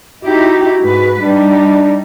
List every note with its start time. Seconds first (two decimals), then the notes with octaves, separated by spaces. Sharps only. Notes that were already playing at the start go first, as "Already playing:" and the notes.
0.24 D#4 E4 F#4 G4
0.81 G#2 B4
1.22 G3 D4 D#4